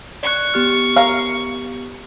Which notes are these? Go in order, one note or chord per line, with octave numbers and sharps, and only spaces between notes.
D5 C#6 F#6
B3 G4 F6
A#4 F5